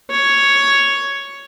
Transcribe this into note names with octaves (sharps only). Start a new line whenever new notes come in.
C#5